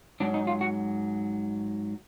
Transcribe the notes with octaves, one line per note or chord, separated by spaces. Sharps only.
G#2 F#3 D4
D#4
F4
F#4